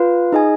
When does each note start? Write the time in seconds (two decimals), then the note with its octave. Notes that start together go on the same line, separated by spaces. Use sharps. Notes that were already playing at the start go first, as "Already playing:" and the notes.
Already playing: F4 B4 F5
0.32 D#4 G#4 D#5 G#5